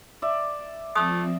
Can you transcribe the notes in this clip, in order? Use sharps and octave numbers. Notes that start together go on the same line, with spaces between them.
D5 E5
F3 A3 C4 D#6 E6